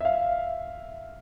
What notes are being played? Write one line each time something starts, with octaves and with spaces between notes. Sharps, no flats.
E5 F5